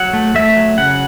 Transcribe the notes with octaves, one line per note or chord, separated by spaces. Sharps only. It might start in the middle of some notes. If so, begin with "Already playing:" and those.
Already playing: F#3 F#5
A3
A3 E5
F#3
C#3 F#5